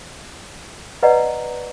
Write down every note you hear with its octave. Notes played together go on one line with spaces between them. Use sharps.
B4 D5 D#5 F#5 A#5